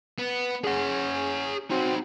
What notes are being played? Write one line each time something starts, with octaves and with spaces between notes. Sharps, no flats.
B3
C#4 G#4 F#5
C4 D#4 F#4